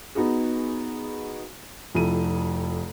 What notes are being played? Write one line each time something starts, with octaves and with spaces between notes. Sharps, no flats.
B3 D#4 F#4 G#4
F1 F2 E4 D#7